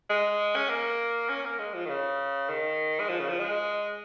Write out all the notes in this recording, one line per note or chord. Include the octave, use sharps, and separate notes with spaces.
G#3
C#4
A#3
C#4
A#3
G#3
F3
D#3
C#3
D#3
G#3
F3
C#3
F3
G#3